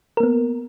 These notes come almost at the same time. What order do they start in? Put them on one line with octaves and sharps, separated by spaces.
A#4 A#3 B3